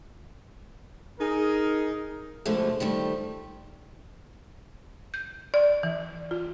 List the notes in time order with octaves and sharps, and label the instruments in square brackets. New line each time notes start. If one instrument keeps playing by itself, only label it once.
[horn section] D#4 G#4 A#4
[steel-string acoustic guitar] B2 D3 F3 G#3 A3
D#3 F3 G3 A3
[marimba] G6
D5
E3
F4